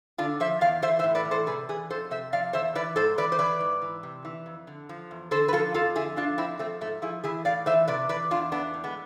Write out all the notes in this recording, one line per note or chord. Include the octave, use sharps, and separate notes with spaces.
D3 D4 F4
F3 C5 E5
E2 D5 F5
E3 C5 E5
C5 E5
A2
B4 D5
E3
A4 C5
C3 G#4 B4
E3 G#4 B4
F2 A4 C5
C3 C5 E5
F3 D5 F5
E2 C5 E5
E3 B4 D5
G#2 A4 C5
E3 B4 D5
C5
E3 B4 D5
G#2
E3
C3
E3
F2
D3
F3
E2
D3 A4 C5
B4
F3 F4 A4
F2 F4 A4
D3 E4 G#4
F3 D4 F4
F2 C4 E4
F3 A3 C4
G#2 A3
F3 E4 G#4
E3 E4 G#4
A2 D5 F5
E3 C5 E5
C3 B4 D5
E3 B4 D5
E2 D4 F4
E3 B3 D4
A2
G#3 B3